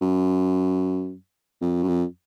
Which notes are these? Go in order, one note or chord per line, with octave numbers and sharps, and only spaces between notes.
F#2
F2
F#2
F2